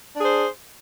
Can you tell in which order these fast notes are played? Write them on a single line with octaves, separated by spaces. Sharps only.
D4 G#4 C5